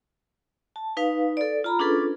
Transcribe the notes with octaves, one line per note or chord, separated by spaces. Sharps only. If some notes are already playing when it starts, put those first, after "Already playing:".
A5
D#4 B4 F5
A4 D5
F4 A#5 B5
C#4 D4 F4 G#4 A4 B4